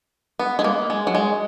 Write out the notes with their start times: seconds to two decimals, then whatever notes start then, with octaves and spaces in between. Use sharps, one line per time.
0.39 B3
0.59 G#3
0.64 A#3
0.90 G#3
1.07 F#3
1.15 G#3